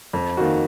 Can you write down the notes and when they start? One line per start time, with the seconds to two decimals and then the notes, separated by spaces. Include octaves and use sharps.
0.13 F2
0.37 D#3 A#3 D#4 F#4